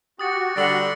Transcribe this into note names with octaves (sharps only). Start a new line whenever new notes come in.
F#4 G4 D#6 A6 C#7
D3 G3 A6 C#7 F#7